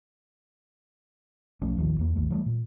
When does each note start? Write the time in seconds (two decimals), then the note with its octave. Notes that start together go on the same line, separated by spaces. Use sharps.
1.62 B1 F3 A3 C#4
1.77 A1 D#2 D#3 F3
1.99 E2 A#3
2.16 G#1 D#2 A3
2.30 E3 G3 A3
2.46 A#2